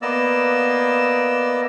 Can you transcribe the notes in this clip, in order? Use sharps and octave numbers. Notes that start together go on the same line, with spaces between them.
A#3 B3 D5 D#5 E6